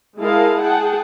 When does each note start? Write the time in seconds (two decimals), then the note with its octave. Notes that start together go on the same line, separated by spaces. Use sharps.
0.18 G#3 E4 A#4 D#5 F5 A5
0.62 G#4 F#5 G5 A5